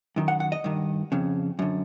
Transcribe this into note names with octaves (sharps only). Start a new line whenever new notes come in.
F#2 D#3
F#5
F#5
D#5
G2 D#3
F2 C#3
F#2 D3